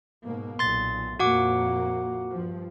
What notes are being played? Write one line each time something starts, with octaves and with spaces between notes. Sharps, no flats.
G#2 B2 A#3
B1 A#2 C6 A6
F2 A#2 A#3 F#4 F#5 D6
G2 F3